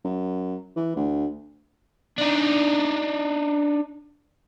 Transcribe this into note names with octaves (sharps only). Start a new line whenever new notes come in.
F#2
E3
D2
D4 D#4